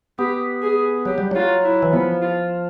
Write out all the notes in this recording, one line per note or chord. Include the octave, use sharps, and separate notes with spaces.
B3 G4
G#4
F#3 G4
G3
F#3 F4
E4
E3
F3 B3
F4